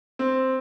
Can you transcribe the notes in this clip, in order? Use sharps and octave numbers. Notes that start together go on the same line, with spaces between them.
C4